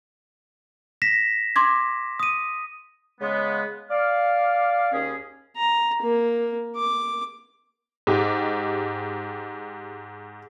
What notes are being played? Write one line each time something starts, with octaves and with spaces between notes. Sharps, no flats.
A#6 B6 E7
C6 D6 G#6
D#6 D#7
C#3 G#3 B3
D5 F5
D#2 C#4 G#4
A#5
A#3
D6
G#2 G4